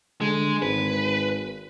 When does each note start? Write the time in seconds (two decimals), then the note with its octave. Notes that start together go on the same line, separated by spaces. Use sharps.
0.21 D3 G#3
0.62 G#1 B4